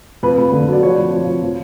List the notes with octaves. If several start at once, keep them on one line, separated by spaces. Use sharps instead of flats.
F2 B4
F2
D3
F#3 D5
F3 C#5
F2
F3
F2
F3